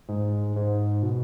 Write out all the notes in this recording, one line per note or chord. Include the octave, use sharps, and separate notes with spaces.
G#2
G#2
B2